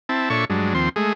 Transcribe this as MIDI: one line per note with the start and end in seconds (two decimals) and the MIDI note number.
0.09 0.29 60
0.09 0.29 64
0.09 0.29 81
0.30 0.45 46
0.30 0.45 62
0.30 0.45 69
0.30 0.45 73
0.30 0.45 76
0.30 0.45 85
0.50 0.74 43
0.50 0.74 54
0.50 0.74 56
0.50 0.74 62
0.75 0.89 39
0.75 0.89 53
0.75 0.89 60
0.75 0.89 84
0.96 1.13 56
0.96 1.13 57
0.96 1.13 68